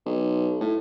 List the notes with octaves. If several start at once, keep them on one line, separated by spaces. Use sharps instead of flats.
B1
A2